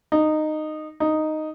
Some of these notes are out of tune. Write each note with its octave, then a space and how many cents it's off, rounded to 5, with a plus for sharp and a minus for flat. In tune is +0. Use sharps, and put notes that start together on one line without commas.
D#4 -15
D#4 -5